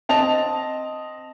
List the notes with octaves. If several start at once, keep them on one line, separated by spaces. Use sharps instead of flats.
C4 D#5 A5 F7